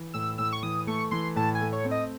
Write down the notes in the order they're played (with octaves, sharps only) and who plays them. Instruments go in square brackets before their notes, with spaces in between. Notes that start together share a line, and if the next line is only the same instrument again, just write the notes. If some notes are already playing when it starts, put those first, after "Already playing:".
Already playing: [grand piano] E3
[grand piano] A2 [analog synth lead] E6
[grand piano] A2 [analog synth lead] E6
[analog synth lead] C#6
[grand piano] E3 [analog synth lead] D#6
[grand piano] A3 [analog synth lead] C#6
[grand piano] E3 [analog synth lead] C6
[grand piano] A2 [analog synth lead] A5
[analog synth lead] G#5
[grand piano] A3
[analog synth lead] C#5
[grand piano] C4
[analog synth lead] D#5